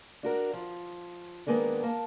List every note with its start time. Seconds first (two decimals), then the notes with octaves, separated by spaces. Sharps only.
0.23 D4 F#4 A#4
0.53 F3
1.47 D#3 G#3 A#3 B3 D4
1.83 A#3 A5